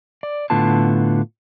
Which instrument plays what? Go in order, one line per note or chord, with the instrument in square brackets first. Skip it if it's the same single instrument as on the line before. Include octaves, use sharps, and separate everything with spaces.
[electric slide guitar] D5
A2 D3 B3 F4 A5